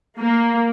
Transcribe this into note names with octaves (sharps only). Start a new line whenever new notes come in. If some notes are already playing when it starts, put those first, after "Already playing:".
A#3